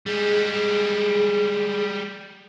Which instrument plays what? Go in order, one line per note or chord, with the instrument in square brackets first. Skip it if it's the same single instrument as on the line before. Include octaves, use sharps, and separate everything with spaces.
[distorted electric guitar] G3 G#3 [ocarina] G#4